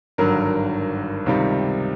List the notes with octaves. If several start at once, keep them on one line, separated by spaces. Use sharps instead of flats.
G#1 G2 D3 F#3 A#4
C#2 C3 D#3 G3